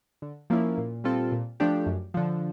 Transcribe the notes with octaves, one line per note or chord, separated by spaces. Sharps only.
D3
F3 A#3 C#4 E4
A#2
G3 C4 F4 A4
A#2
F3 A3 D4 G4
F#2
D3 F3